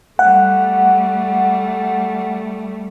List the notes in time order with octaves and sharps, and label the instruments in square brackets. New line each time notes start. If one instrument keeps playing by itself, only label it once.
[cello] G3 A3 [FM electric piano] F#5